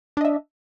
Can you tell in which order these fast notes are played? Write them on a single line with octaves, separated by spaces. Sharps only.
D4 D#5 E5